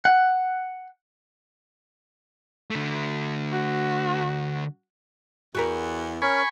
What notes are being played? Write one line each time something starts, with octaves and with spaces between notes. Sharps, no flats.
F#5
D3 A3
F#4
E2 F#4 G4 A#4
C#4 A#4 G#5 B5 C#6